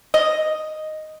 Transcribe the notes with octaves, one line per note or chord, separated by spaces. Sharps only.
D#5